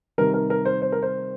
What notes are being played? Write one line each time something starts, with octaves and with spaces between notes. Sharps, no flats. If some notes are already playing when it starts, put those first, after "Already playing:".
C3 D#3 G3 A#4
A#4
A#4
C5
C5
A#4
C5